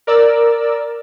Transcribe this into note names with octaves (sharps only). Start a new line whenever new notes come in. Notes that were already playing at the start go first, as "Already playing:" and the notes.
A#4 D5 E6